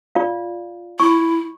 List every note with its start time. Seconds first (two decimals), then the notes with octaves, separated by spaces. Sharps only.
0.15 F4 D5 F5
1.00 E4 C#6